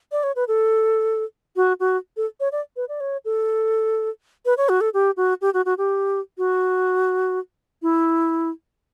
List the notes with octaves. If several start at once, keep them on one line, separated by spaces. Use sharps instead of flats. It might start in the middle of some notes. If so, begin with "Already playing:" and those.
D5
C#5
B4
A4
F#4
F#4
A4
C#5
D5
B4
D5
C#5
A4
B4
C#5
F#4
A4
G4
F#4
G4
F#4
F#4
G4
F#4
E4